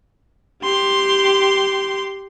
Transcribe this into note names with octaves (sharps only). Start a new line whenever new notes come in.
G4 C6